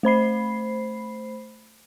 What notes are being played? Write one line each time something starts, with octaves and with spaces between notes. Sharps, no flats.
A3 C5 B5 C7